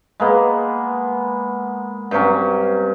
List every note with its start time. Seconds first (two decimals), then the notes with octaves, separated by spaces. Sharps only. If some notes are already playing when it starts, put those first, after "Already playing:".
0.20 G#3 A#3 B3
2.11 G2 C3 F#3 C#4